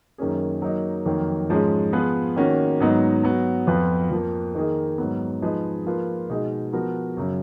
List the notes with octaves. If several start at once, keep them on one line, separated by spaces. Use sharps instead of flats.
F#2 D#3 A#3 C#4 G#4
F#3 A#3 D#4
F2 D#3 F#3 A#3
G#2 F3 G#3 C#4 G#4
F3 B3 F4 G#4 B4
D#3 A#3 C#4 F#4
G#2 F#3 B3 D#4
F#3 B3 F#4
F2 F3 B3 F4 B4
F2 F3 A#3
D#3 A#3 D#4 G#4
G#2 F#3 B3
F3 G#3 D#4 G#4 B4
F3 A#3 F4 B4
B2 G#3 D#4 G#4
F3 B3 F#4 A#4
F#2 C#3 F#3